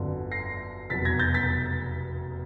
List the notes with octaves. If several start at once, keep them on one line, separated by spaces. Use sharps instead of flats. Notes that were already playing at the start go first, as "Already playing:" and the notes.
Already playing: G1 F2 D3 F#3
A#6 C7
F1 E2 B2 F#3 A6 B6
G#6 A#6
G6 A6
A6 B6